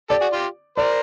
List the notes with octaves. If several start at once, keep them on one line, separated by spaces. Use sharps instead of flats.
G4 A4 D5
F#4 G#4
F4 G4
A#4 C5 D5